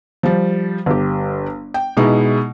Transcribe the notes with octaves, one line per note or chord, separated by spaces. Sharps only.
F3 G3
G1 G4
G5
B2 G#3 D#4 E4